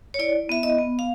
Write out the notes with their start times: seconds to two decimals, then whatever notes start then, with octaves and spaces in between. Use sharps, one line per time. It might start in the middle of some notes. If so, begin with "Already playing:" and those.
0.14 C#5
0.19 E4 D5
0.49 B3 E5
0.63 D#5
0.78 B3
0.99 F5